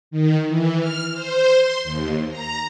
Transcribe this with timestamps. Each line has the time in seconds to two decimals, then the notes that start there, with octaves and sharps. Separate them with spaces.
0.11 D#3
0.48 E3
0.80 F6
1.13 C5
1.53 C6
1.84 D#2
2.29 A#5